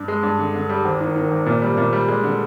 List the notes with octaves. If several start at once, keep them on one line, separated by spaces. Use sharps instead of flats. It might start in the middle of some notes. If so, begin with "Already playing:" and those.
Already playing: G2
G#3
G2
D3
D3
G3
G#1
D#3
D#3
G#1
A#2
G3
A#2
G3
G#3
D3